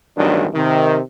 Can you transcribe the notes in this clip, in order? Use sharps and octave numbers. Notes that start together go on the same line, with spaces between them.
A1 E2 G2 D#3 F#3 D4
C3 D#3